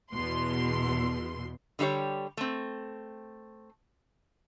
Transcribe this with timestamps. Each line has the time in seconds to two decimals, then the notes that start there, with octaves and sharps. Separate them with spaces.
0.13 E2 B2 C6
1.79 D3 G3 D#4 G4 C#5
2.37 A3 C4